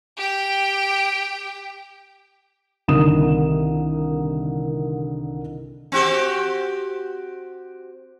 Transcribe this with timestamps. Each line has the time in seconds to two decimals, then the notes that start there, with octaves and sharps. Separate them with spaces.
0.17 G4 G5
2.88 C2 D3 D#3 A#4 D#6 E7
5.92 C4 F#4 G4